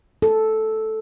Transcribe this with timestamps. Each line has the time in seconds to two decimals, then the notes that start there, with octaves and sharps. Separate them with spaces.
0.22 A4